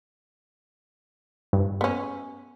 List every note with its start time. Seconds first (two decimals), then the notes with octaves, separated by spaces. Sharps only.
1.53 G2
1.81 B3 C#4